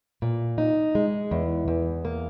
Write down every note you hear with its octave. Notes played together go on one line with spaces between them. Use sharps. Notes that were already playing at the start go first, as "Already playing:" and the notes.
A#2
D#4
G#3
E2
E2
A#3